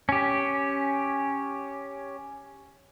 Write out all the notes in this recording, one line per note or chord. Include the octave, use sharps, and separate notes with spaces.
C#4 G4